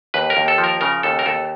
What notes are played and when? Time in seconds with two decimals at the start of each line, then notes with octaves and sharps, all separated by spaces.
0.14 D#2 B4
0.30 A#4
0.37 D#2
0.48 A4
0.58 F3
0.64 A#4
0.81 C#3 A#4
1.03 D#2 A4
1.19 A#4
1.26 D#2 A4